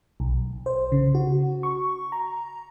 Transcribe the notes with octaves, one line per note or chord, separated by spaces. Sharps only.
B1
C5
C#3
F#4
C#6
A#5